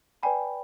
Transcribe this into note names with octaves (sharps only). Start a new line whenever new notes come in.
B4 D5 G5 G#5 B5